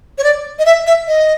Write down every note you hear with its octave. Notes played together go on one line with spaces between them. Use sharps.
C#5
D5
D#5
E5
E5
D#5